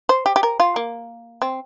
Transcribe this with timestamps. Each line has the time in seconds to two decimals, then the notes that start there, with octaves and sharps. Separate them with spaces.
0.09 C5
0.26 G4
0.36 G4
0.43 A#4
0.60 F4
0.76 A#3
1.42 C4